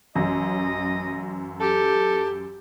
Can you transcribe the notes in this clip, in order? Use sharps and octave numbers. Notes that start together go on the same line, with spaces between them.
A1 F#2 D#5
G4 A4